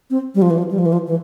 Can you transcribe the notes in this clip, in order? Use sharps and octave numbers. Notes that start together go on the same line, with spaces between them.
C4
G3
F3
E3
F3
G3
F3
E3
F3
E3